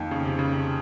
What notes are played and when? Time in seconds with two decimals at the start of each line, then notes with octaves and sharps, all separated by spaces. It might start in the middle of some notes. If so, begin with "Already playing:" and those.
Already playing: F2 D#3 A#3
0.11 C#3
0.25 C3
0.39 C#3
0.52 C3